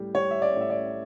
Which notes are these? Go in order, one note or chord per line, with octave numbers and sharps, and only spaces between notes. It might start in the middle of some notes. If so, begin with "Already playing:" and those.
Already playing: A2 G3
G3 C#5
E5
D5
A2 E5
D5